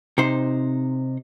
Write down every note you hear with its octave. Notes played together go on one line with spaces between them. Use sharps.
C3 D#4 C5